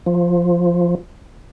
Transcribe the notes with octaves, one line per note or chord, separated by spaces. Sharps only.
F3